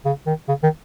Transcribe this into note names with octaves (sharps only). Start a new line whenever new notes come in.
C#3
D#3
C#3
D#3